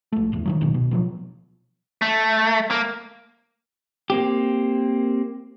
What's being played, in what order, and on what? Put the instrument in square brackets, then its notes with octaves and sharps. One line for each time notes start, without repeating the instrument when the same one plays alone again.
[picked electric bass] A#1 A3
D1 G1 E2
D#3 F3 F#3
C2 B2 D#3
B2
B2 F3 F#3
[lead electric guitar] A3
A#3
[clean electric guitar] A#3 C4 G4